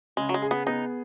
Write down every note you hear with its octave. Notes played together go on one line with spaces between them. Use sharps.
C#3 G#3
F#3
G#3
G#4
B3
B3 D#4